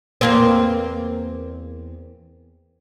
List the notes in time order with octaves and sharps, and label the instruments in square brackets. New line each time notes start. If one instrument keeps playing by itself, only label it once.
[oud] E2 A#3 C4